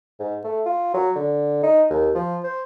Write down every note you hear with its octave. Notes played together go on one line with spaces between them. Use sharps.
G#2
A3
F4
F#3
D3
D#4
D#2
F3
C5